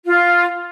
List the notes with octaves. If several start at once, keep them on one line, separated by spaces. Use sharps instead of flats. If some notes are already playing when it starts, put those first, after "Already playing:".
F4